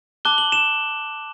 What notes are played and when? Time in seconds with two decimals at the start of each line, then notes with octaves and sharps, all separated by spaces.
0.25 A5 D6 F#6 G7
0.38 F#7
0.52 E7